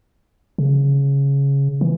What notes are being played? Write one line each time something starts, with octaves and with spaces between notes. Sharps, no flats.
C#3
E3